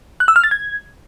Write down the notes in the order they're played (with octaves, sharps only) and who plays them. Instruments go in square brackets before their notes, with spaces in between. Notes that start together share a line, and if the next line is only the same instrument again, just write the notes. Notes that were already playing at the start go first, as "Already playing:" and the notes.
[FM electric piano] F#6
E6
F6
A6
G#6